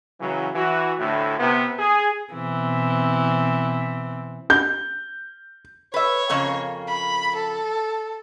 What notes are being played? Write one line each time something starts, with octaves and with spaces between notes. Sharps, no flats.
C#3 E3 F#3
E3 F#4
D2 A2 D3 E4
C3 B3
G#4
B2 E3 C4
G6
B4 C#5 E5
F2 C#3 A#3
B5
A4